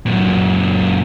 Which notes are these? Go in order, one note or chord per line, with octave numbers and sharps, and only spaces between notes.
F#2 A#2